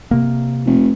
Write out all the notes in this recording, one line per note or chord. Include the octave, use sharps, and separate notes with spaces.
C3 A#3
F1